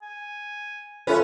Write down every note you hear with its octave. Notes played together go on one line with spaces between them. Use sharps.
G#5
C#4 F4 A4 B4 E5